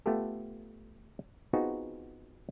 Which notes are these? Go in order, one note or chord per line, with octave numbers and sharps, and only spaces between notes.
A3 B3 F4 G4 A4
B3 C4 D#4 F4 F#4 G#4